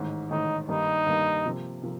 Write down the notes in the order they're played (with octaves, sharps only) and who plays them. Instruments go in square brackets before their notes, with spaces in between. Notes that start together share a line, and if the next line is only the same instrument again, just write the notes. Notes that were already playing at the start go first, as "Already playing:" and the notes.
Already playing: [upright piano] A1 G#2 D#3
[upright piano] A1 G#2 D#3 [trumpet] D#4
[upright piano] G2 D#3 G3 A#3 [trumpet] D#4
[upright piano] G2 D#3 G3 A#3
C3 F3 A#3
C3 F3 A#3